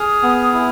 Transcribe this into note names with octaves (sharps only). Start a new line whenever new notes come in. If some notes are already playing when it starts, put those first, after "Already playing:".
Already playing: G#4 D#6 F6
B3
E4